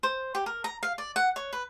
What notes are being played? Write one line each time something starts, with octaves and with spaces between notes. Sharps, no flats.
C5
G4
A#4
A#5
F5
D5
F#5
C#5
B4